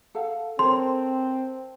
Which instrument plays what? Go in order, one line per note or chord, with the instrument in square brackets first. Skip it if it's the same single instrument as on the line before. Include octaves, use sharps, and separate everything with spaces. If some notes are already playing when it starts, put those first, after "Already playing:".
[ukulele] A4 F5 F#5
[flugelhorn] C4 [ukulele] A4 A#4 C#5 [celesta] C6